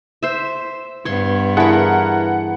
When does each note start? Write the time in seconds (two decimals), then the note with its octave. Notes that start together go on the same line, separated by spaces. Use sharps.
0.23 C5 E5
1.05 G2 B3 C#5 C6
1.57 E3 G#4 A#4 F#5 A5 B5